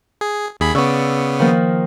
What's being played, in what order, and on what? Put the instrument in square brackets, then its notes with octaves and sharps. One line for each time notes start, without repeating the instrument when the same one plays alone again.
[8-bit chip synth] G#4
D#2 G#4 B5
[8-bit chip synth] C#3 B3 [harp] D5 C#6 E6
[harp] D#3 F3 A#3